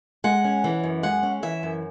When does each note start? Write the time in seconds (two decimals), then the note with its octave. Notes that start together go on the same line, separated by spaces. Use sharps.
0.24 G#3 F#5
0.44 C#4
0.64 E3
0.84 F#2
1.03 G#3 F#5
1.23 C#4
1.43 E3 E5
1.63 F#2